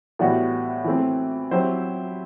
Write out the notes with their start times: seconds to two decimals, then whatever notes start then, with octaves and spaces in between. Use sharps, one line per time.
0.19 A2 E3 G3 B3 F#4
0.84 E3 A3 C4
1.51 F#3 C4 E4 G4 C5